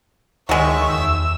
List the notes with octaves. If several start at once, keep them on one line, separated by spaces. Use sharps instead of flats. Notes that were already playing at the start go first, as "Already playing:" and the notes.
D2 D#3 F#3 G#3 E5 C#6
E2 E6